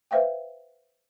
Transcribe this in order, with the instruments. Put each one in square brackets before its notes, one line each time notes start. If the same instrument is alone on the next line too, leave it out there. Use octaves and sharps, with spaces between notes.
[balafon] B4 C5 E5 F5 G5